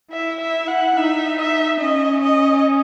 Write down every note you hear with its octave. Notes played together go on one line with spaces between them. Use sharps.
E4 E5
E5
F#5
D#4 E5
E5
C#4 D#5
D#5